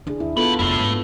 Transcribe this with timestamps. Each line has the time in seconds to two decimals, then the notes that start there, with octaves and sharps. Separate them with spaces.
0.07 D3 D4 E4 G#4
0.20 D#2 E4
0.37 B3 F4 F#4 A4 B5
0.59 F1 F#2 A3 E4
0.79 G#2 C#4